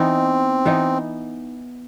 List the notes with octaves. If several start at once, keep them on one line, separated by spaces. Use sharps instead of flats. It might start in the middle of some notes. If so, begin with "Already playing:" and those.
Already playing: E3 B3 C4 D#4
E3 B3 D#4